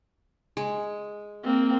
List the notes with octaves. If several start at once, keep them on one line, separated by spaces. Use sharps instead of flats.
G#3
A#3 C4